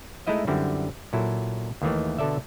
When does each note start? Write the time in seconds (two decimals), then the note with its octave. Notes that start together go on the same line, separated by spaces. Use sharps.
0.27 G#3 A3 D#4 E4 D#5 E5
0.47 F#2 D3 G3 C4 E4
1.13 A#2 F#3 E4 A4
1.82 D#2 D#3 E3 A3
2.18 B2 D3 A4 D5 E5